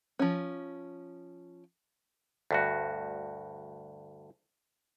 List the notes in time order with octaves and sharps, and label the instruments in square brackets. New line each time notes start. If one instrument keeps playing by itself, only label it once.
[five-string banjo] F3 C#4
[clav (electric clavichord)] D2 G2 F#4